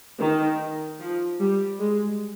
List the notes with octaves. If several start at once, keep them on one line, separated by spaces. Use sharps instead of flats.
D#3
F3
G3
G#3